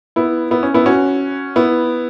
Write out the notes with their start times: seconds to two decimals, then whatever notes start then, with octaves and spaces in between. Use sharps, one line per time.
0.16 B3 E4
0.51 B3 E4
0.63 C#4
0.74 B3 E4
0.86 C#4 F#4
1.56 B3 E4